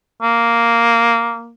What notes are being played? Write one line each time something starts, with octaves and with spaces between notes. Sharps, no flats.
A#3